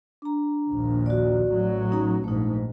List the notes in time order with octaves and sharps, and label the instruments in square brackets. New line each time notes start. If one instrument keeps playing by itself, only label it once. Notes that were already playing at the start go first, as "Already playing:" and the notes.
[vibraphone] D4 A#5
[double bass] A#1 D#2
[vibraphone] F#4 D5
[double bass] A1 F#3
[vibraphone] C#4 D#4 A#5
[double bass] A#1 G#2 [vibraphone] A3 D#4